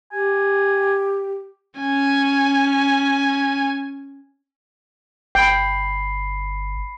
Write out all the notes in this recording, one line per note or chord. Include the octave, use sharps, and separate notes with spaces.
G4 G#5
C#4 G#5
G1 G5 B5 C7